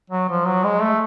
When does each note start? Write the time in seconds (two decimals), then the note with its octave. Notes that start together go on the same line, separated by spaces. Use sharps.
0.10 F#3
0.29 F3
0.47 F#3
0.64 G#3
0.82 A3